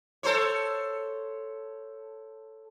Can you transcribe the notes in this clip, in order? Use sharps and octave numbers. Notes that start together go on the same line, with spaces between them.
A4 C5 C#5